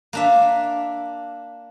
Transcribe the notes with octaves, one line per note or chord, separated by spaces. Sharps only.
A#3 D4 E5